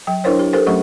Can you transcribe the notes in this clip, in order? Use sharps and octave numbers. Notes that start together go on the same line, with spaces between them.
F#3 G5
D4 E4 A#4 C5 C#5
G4
G4 A4 A#4 C5
F#3 A3 C#4 G4 F#5 C#6